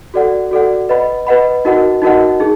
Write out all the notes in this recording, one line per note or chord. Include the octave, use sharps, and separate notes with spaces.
F#4 A4 D5 F#5
F#4 A4 D5 F#5
B4 D#5 F#5 B5
B4 D#5 F#5 B5
D#4 F#4 A#4 D#5 F#5
D#4 F#4 A#4 D#5 F#5
D#4 G#4